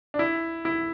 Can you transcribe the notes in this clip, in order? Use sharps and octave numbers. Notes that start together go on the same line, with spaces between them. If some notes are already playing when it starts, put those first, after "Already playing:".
D4
E4
E4